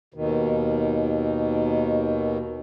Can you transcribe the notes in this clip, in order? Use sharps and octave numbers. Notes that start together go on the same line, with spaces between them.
D#2 B2 D#3